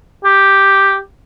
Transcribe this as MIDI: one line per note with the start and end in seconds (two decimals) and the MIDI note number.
0.24 0.99 67